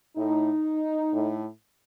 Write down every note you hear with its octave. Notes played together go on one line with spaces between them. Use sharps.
A2 D#4
A2